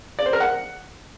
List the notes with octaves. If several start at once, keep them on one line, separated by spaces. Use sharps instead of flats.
D5
C5
A#4
F#5